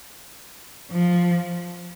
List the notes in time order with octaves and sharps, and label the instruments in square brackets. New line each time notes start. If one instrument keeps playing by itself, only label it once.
[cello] F3